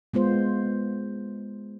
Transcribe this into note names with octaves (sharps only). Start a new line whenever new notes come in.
G#3 B3 F4 C5